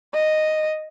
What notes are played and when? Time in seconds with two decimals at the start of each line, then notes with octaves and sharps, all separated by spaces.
0.14 D#5